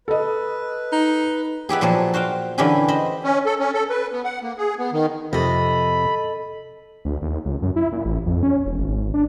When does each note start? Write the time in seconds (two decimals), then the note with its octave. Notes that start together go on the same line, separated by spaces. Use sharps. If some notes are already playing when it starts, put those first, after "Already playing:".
0.08 A4 B4 D#5
0.92 D#4
1.69 B3 E4 G4 G#4
1.81 A#2 F3 F#3 G#4 A5
2.14 F#4 C5 F5 G5
2.58 D3 E3 C#4 E4 G4 G#4
2.88 C5 D#5 B5
3.24 C#4
3.46 A4
3.59 C#4
3.74 A4
3.90 B4
4.12 B3
4.25 F#5
4.42 A#3
4.58 G#4
4.78 B3
4.93 D#3
5.33 F2 C3 A4 D#5 B5
7.05 D2
7.22 D#2
7.45 C#2
7.62 F#2
7.76 E4
7.92 A#2
8.05 A1
8.26 F2
8.43 C#4
8.65 E1
8.78 G#1
9.14 D4